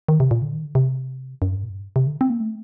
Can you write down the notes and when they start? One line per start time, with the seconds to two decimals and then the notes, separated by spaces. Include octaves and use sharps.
0.09 D#3
0.20 C3
0.31 A#2
0.42 D3
0.53 D#3
0.64 D3
0.75 C3
1.42 F#2
1.52 G2
1.63 A#2
1.69 F#2
1.75 G2
1.96 C3
2.07 D3
2.21 C4
2.30 A#3
2.40 A3